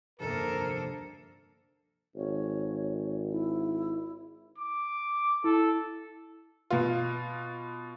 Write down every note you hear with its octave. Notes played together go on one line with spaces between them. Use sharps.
F1 D2 G2 A#3 A4 A#4
G#1 C#5
E4
D6
E4 A4
B2 F4